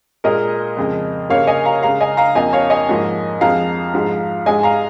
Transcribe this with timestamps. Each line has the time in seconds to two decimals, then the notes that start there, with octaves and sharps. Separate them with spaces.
0.24 A#2 G#3 A#4 D#5
0.77 F2 C#3 G#3
1.30 C#3 A#3 C#5 F5
1.47 D#5 G#5
1.65 F5 A#5
1.83 C#3 G#3 F5 A#5
2.00 D#5 G#5
2.17 F5 A#5
2.35 F2 F3 A#3 D#5 G#5
2.53 C#5 F5
2.70 D#5 G#5
2.89 G#2 F3 A#3
3.40 F2 F3 G#3 F5 A#5
3.94 G#2 F3 G#3
4.46 G#2 G#3 D#5 G#5
4.63 F5 A#5